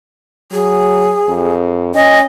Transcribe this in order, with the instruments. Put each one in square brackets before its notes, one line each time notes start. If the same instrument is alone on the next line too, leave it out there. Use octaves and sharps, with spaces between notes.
[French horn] F#3 [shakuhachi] G#4
[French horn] F2
[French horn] C#4 [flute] D#5 [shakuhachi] G#5